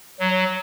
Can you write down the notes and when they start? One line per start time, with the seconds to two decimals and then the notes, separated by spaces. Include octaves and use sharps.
0.19 F#3